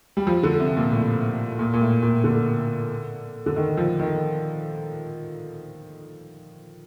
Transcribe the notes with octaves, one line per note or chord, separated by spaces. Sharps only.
G3
F3
D3
C3
A#2
A2
A#2
A#2
A2
A#2
D3
D3
D#3
F3
D#3